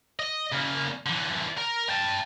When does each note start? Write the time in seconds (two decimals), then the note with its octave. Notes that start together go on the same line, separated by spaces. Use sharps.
0.20 D#5
0.53 C#3 A#3
1.06 D3 E3
1.58 A#4
1.89 G5 A5